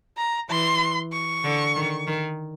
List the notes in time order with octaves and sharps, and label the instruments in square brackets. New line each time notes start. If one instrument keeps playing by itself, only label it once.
[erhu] A#5
[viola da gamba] E3 [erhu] C6
[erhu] C#6
[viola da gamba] D3
D#3
D#3